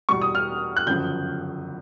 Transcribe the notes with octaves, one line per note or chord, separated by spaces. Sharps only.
E2 B2 G3 C#6
D#6
F6
F#6
G1 F#2 C#3 F3 G6